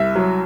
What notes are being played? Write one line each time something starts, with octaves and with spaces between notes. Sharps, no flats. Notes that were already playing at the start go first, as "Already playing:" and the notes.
Already playing: C2 E5
F#3